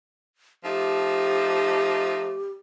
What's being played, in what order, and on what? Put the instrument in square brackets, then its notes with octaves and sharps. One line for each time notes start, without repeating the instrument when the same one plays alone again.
[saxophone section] F3 A3 D#4 [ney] G4